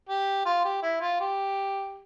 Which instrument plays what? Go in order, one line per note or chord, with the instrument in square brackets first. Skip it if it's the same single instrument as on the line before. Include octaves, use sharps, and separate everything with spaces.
[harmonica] G4
F4
G4
E4
F4
G4